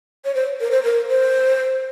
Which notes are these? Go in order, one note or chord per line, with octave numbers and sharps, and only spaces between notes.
C#5
C5
A#4
C5
A#4
C5